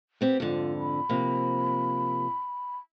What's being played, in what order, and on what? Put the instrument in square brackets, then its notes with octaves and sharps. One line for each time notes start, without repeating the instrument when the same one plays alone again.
[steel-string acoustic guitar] B3 C4 G4
[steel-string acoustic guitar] F2 G#2 D3 [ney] F4
[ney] B5
[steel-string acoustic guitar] C3 F3 A#3